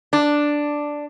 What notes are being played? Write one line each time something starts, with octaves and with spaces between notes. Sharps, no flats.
D4